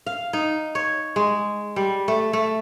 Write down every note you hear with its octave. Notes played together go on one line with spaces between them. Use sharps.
F5
D#4
C#5
G#3
G3
A3
A3